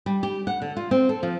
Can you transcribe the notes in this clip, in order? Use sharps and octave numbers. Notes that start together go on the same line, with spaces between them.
G3
G4
F#5
D3
F4
C4
A4
F3